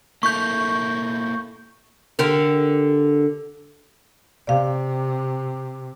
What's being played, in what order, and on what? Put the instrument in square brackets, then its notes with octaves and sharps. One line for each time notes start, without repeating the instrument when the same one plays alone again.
[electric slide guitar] A#3 E4 A4 [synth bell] C#6 G6
[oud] D3 G4 A#4
[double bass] C3 [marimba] D5 F5